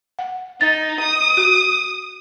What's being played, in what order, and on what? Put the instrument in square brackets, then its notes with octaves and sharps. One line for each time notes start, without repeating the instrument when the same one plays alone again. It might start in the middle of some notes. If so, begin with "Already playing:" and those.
[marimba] F#5
[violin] D#4 [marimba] A6
[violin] D#6
[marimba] F#4